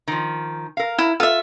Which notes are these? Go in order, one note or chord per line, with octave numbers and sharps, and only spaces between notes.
D#3 F3
A#4 F5
E4
F4 A4 E5